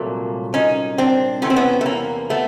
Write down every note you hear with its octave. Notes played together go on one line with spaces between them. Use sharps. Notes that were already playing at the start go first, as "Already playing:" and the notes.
Already playing: C2 A#2 F#3 A3 A#3
C#4 D#4
C4 D4
E2 C3 E3 A3 C#4
C4
B3 C#4
A3
A#3
A3 B3